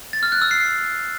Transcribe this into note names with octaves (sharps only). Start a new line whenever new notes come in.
A6
F6
F#6
E6
C7